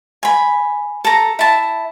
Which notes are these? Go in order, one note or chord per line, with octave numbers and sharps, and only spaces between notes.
G#5 B5
A4 A#5
E4 A5